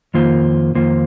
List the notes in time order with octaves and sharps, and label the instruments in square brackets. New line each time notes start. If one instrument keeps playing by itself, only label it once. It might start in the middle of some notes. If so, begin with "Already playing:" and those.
[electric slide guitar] F2 D#3 A#3 F4 C5
F2 D#3 A#3 F4 C5